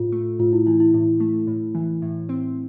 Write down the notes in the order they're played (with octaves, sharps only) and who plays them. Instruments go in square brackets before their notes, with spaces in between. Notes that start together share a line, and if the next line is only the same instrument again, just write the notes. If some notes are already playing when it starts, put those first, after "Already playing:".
Already playing: [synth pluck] A2 [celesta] F4
[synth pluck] A3
[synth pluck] A2 [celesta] F4
[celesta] E4
[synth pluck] E3 [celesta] E4
[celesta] E4
[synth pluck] A2 [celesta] E4
[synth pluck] A3
A2
E3
A2
C4